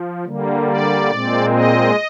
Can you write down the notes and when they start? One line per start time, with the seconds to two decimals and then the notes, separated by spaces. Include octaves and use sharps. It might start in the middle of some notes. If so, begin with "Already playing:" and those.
Already playing: F3
0.26 D3 G3 A#3
0.69 D5
1.11 A#2 G#3 C4
1.53 D#5